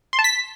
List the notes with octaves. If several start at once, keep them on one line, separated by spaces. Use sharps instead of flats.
C6
A5
B6